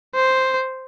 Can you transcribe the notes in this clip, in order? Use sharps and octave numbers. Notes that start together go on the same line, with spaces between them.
C5